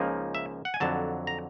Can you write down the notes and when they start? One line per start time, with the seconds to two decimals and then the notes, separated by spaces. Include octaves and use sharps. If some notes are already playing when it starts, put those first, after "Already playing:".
Already playing: C#2 C#3 F3 A#3 D#4
0.35 E5
0.65 F#5
0.74 G#5
0.80 F2 D3 F#3 A5
1.27 A#5